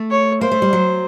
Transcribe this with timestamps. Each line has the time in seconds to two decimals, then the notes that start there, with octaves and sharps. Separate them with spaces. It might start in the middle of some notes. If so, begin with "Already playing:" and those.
Already playing: A3
0.10 C#5
0.41 A#3 C5
0.51 A3
0.62 G3
0.73 F#3